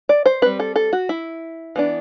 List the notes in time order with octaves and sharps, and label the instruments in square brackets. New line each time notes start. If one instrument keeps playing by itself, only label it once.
[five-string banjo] D5
C5
G3 C4 B4
A4
A4
F#4
E4
E3 B3 D4